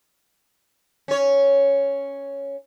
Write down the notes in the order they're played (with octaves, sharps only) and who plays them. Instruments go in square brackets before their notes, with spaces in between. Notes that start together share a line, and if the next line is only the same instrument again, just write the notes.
[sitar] C#4 C#5